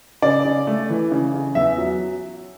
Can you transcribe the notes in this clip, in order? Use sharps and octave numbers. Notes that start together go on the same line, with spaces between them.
C#3 D5
C#3
A3
E3
C#3
C#3
E2 E5
F#3